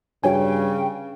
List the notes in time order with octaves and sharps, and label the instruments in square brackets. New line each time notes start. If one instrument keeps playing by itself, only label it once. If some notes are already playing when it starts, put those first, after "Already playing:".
[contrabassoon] G2 [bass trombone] C#3 [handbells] F#4 C#5 G#5 [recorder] G5